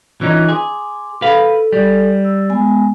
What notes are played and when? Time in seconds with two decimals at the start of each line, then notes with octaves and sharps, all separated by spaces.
0.21 E3 C#4 D#4 F4
0.49 G#4 C6 D6
1.22 A4 B4 F5
1.73 G3
2.25 E6
2.49 G#3 B3 G#5